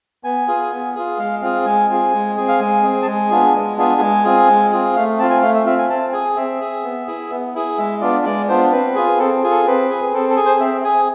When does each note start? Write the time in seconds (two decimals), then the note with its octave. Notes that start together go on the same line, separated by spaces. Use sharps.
0.24 B3 G#5
0.48 F4 G#4
0.71 B3
0.95 F4 G#4
1.18 G#3 F5
1.41 C4 F4 G#4 F5
1.65 G#3 G#5
1.89 C4 F4 G#4
2.13 G#3
2.37 C4 G#4
2.48 F5
2.59 G#3 G#5
2.83 C4 G#4
3.02 A5
3.06 G#3 G#5
3.30 B3 D4 F4 G#4
3.54 G#3
3.77 B3 D4 F4 G#4
4.01 G#3 G#5
4.24 C4 F4 G#4
4.48 G#3
4.72 C4 F4 G#4
4.95 A3 F5
5.19 C4 F4 A5
5.30 G#5
5.42 A3 F5
5.55 E5
5.66 C4 F4 E5
5.78 G#5
5.90 C4 A5
6.13 G#4 G#5
6.36 C4 E5
6.61 G#4
6.84 B3
7.07 E4 G#4
7.31 B3
7.55 E4 G#4
7.78 G#3 E5
8.01 B3 D4 F4 D5
8.25 G#3 D5
8.49 B3 D4 F4 C5
8.72 C4 B4
8.95 F4 G#4
9.19 C4 A4
9.43 F4 G#4
9.51 A4
9.66 C4 B4
9.90 G#4
10.13 C4 A4
10.29 A4
10.36 G#4
10.45 C5
10.60 C4 E5
10.84 G#4 G#5